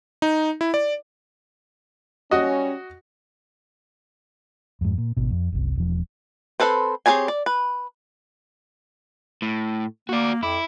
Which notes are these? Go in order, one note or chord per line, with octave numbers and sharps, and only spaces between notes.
D#4
E4
D5
G3 C#4 F#4 D#5
F2 G#2
A#2
G#1 B2
F2
F#1 C2
E1 F3
C4 F4 A4 B4 C5
C4 G4 G#4 C#5 G#5
D5
B4
A2
A#3 F#4 D5
F2 E4 D6